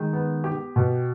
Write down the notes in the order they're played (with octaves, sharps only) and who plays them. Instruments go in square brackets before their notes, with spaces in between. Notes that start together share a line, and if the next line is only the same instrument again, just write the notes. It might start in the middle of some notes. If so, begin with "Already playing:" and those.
Already playing: [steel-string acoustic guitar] D#3 [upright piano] G#3
[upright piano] B3
G4
B2